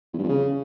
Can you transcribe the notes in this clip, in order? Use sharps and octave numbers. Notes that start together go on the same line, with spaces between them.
E2
G2
F2
C#3